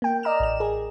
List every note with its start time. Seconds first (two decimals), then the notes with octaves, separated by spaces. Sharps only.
0.02 A#3 G5
0.23 D5 D#5 A#5 F6 E7
0.40 A1 E7
0.60 G#4 A#4